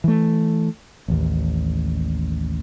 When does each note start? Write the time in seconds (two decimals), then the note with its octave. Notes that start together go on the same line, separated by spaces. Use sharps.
0.04 E3 A3
1.08 A1 D#2